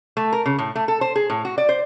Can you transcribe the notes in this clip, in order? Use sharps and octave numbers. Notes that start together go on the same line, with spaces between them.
A3
A#4
C#3
A2
A3
A4
C5
G#4
A2
F#4
D5
C5